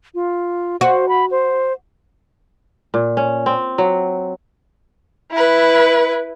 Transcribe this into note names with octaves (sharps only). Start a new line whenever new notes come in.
F4
F#4 C5
B5
C5
A#2
C#4
C4
F#3
E4 B4